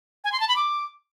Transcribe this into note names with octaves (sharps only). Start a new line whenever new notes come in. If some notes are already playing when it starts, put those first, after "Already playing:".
G#5
C6
A5
B5
D6